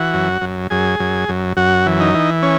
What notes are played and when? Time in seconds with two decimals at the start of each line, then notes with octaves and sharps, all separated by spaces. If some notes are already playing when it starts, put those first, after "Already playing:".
Already playing: E3 F#4
0.14 F#2
0.42 F#2
0.70 F#2 G#4
1.00 F#2
1.29 F#2
1.57 F#2 F#4
1.86 E3
2.00 D#4
2.14 E3
2.42 C#4